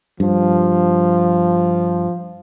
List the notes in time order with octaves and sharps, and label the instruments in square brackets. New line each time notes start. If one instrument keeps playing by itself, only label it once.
[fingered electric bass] G2 [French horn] F3